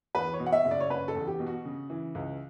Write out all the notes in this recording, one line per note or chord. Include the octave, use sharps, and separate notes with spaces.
E2 B4
C#5
B2
F#5
E5
F#1
D5
C#5
F#1 B4
A4
E2
G4
B2
F#4
C#3
E3
C#2